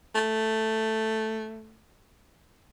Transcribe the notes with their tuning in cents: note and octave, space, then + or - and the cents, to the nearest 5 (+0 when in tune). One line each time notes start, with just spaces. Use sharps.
A3 +0